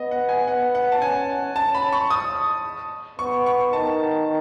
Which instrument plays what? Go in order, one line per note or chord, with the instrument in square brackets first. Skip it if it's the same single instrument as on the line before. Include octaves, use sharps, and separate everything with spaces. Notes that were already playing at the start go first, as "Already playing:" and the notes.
Already playing: [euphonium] B3 [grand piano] D#5
[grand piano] F#5
G#5
[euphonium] B3 [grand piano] F#5
[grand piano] F#5
A5
[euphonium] C#4 [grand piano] G#5
[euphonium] C#4 [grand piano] A5
[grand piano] B5
C#6
D#6
[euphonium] B3 [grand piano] C#6
[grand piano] C#6
[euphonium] D#3 [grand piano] A5